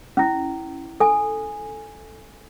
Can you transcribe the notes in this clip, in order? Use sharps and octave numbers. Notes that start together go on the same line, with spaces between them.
C#4 E4
A4 G#5